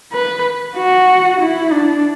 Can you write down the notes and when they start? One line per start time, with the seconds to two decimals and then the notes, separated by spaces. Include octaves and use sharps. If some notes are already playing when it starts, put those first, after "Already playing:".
0.13 B4
0.77 F#4
1.40 E4
1.73 D4